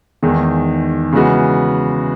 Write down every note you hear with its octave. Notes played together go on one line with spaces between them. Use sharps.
E2 D#3 G#3 D#4
C#3 E3 G#3 B3 F#4